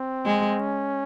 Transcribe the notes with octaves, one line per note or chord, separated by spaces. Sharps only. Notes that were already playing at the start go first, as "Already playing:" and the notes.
Already playing: C4
G#3
C#4